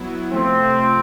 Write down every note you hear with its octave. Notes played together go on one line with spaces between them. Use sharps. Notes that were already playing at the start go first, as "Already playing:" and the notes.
Already playing: F#3 B3 E4
C3 F3 A3 C4